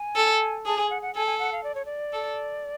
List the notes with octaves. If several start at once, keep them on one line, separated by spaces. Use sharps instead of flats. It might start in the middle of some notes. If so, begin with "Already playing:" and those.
Already playing: G#5
A4
G#4 A5
G#5
F#5
F#5
A4 G#5
G#5
F#5
F5
D5
C#5
D5
A4